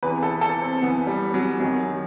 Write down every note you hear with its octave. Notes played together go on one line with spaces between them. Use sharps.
E2 C3 E3 B4
A4
A4
C4
F#2 E3 B3
G3
F#3
F#2 D#3 F#3